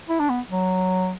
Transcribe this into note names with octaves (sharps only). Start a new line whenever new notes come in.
E4
D4
B3
F#3